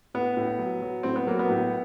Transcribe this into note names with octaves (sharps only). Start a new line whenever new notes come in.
A2 B3
A2
F#3
F#3
A2 C4
B3
F#3 A#3
B3
A2